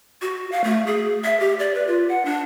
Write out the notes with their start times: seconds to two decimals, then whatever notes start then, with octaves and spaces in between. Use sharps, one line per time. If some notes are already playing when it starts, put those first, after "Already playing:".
0.22 F#4
0.52 F5
0.64 A3
0.86 G#4
1.24 E5
1.40 G4
1.59 D5
1.75 B4
1.87 F4
2.09 F#5
2.25 D4